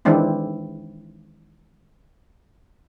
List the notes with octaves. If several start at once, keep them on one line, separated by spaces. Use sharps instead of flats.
D#3 E3 G#3 C4 D4 E4